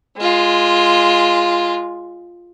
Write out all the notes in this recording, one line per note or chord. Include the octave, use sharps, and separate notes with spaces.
G#3 F4